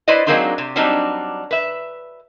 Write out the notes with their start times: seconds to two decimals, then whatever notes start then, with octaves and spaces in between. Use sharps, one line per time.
0.08 E4 B4 C5 D5 D#5
0.27 F#3 G#3 A#3 C4 D4 D#4
0.58 C3
0.76 F#3 G3 C4 D4 D#4
1.51 B4 E5